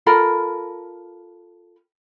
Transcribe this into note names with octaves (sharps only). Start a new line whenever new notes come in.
F4 A4 A#4 B5